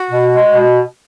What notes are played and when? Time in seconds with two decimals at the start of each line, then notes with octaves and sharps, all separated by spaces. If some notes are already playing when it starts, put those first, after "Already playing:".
Already playing: F#4
0.11 B2
0.33 G#3
0.53 B2